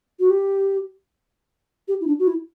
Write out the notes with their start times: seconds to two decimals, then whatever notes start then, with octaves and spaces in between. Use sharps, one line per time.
0.20 F#4
0.30 G4
1.88 G4
2.01 E4
2.07 D4
2.19 F#4
2.27 E4